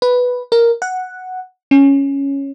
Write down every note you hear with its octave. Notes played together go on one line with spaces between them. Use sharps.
B4
A#4
F#5
C#4